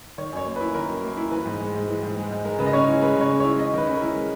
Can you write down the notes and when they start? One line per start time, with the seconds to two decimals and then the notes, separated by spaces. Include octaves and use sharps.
0.18 D#3 C#5
0.32 F#2 C#5
0.46 A#3
0.56 E4 B4
0.74 D#3 A#4
0.89 F#2
1.03 A#3
1.17 E4
1.31 E3 B4
1.46 G#2
1.60 G#3
1.75 G#2
1.88 E3
2.03 G#2
2.17 G#3
2.31 G#2
2.45 G#3 A#4
2.59 C#3 B4
2.66 D#5
2.73 C#4 C#5
2.88 E4
3.01 G#3 B4
3.16 C#3
3.21 C#5
3.30 C#4
3.40 E4 C#5
3.59 G#3 D#5
3.74 D#3 B4
3.87 C#4
3.96 E4 A#4
4.16 G#3